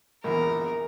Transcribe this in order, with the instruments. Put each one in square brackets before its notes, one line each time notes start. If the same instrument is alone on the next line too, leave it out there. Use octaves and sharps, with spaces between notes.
[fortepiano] A#1 E2 [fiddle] A#4